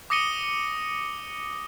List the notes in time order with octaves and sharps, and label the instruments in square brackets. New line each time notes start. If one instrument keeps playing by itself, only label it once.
[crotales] D6 D#6 A#6 C#7 D#7 G7